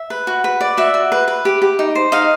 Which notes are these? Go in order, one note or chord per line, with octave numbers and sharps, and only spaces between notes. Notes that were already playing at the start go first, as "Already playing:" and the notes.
Already playing: E5
B4
F#4
B4
D5
F#4 E5
F#4
B4
B4
G4
G4
D#4
C5
D#4 D#5 F5